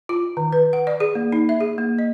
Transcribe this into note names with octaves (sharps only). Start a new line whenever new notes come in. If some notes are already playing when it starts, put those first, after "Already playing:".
F4
D#3
B4
F#5
D5
G#4
A#3
D#4
E5
G#4
A#3
D#5